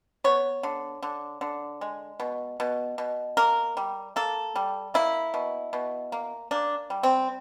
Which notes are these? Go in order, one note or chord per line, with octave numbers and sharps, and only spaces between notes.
B3 C#5
D3
D3
D3
G#3
B2
B2
B2
A#3 A#4
G3
A#3 A4
G3
A#3 E4
B2
B2
A#3
A#3 D4
G3
C4